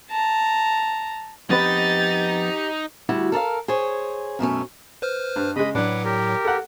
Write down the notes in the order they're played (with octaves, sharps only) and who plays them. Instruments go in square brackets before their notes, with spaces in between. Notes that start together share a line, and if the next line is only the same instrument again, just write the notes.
[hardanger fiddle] A5 A#5
[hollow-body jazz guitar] F2 B3 B4 [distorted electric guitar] D#4 D#5 [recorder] G4 [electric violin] A6
[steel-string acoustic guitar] D2 G3 E4 F#4
A4 A#4 D5 F5
G#4 C5 C#5
F#2 B2 A3 C#4
[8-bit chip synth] B4 C5 F6
[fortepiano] G2
[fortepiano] C#3 G#3 [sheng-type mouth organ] D#5 B5 D#6
[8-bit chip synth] A2 F#3 [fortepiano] D4 [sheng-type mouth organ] B4 F#5 D6
[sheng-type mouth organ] G4 A#4
[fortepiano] A4 F#5